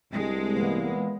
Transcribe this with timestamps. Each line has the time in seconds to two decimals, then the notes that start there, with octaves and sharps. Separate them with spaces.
0.12 C2 C3 G#3 B3 D4
0.56 A#2 E3 A#3 B3